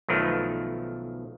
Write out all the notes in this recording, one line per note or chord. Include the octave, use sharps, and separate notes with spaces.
B1 B2 D#3 F3 A3